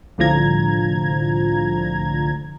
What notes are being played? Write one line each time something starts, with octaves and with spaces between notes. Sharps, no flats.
C2 A2 D3 F3 A#5 G#6